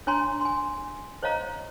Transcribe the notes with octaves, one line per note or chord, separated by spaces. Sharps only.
D4 C#5 G#5 A#5 C6
G#5 C6
C5 C#5 D#5 F5 A#5